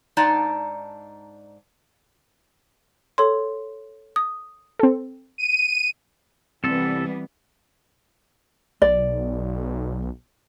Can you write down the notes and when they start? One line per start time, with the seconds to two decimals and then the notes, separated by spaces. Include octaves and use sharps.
0.17 G#2 D4 D#4 D5 A5 A#5
3.18 A4 C#5 C6
4.16 D#6
4.79 C4 A4
5.38 D#7
6.64 C2 E3 G3 B3 C4 A4
8.82 B1 D5